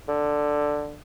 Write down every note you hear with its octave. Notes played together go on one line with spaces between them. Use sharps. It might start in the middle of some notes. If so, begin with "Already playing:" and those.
D3